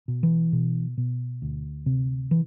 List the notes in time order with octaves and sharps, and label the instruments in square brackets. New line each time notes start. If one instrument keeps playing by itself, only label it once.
[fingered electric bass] B2
E3
B2
B2
D2
C3
E3